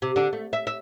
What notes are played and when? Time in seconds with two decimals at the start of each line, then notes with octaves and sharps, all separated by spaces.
0.02 C3
0.16 D3 D4
0.33 A3
0.53 E5
0.67 E5